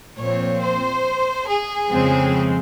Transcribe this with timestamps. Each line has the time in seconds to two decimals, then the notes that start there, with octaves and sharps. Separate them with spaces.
0.17 A#2 F3 C4 C#5
0.61 C5
1.48 G#4
1.91 F2 C#3 F3 G#3 C4